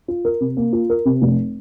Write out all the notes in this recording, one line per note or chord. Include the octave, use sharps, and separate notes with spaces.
F4
A#4
C3
A#3
F4
A#4
C3
F1